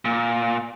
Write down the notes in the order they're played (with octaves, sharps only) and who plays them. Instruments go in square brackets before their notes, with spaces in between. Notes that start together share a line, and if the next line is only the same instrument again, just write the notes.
[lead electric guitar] A#2